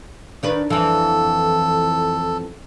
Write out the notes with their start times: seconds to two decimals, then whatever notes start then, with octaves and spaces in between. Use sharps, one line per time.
0.43 D#3 D4 B4
0.70 F2 E3 A4